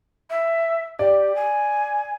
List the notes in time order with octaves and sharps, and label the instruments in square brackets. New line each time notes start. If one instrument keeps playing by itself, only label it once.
[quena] E5
[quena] G4 [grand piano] D5
[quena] G#5